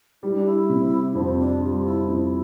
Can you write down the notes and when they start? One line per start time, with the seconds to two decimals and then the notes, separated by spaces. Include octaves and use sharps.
0.23 G3 E4
0.34 D4
0.46 E4
0.69 C3
1.15 F2 C4
1.39 D4
1.61 G3 F4
1.85 E4
2.08 F2 E4